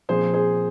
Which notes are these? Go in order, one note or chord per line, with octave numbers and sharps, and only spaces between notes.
A#2 F3 C4 G#4 C5
G#4 C5